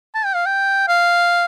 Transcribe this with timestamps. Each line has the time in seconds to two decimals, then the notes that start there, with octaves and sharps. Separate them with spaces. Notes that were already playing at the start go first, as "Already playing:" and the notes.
0.15 A5
0.25 G5
0.35 F5
0.46 G5
0.88 F5